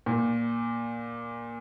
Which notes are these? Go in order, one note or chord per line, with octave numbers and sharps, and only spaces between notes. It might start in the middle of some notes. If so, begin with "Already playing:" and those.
A#2